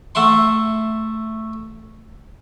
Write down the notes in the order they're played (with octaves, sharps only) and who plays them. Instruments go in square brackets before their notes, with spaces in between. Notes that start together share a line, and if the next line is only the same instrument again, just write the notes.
[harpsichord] A3 E5 F#5 C6